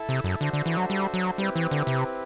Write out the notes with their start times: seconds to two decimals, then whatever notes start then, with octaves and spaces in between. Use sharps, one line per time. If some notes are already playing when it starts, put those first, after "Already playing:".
Already playing: E4 A4 E5 A5
0.09 C3
0.24 F#2
0.41 D3 D4 F#4 A4 C5 E5
0.53 D3
0.66 E3
0.77 F#3
0.90 G3
1.14 F#3
1.38 G3 C4 E4 G4 B4
1.56 E3
1.71 D3
1.87 C3